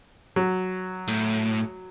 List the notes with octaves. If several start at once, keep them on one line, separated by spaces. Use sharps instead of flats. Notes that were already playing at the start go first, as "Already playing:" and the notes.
F#3
A2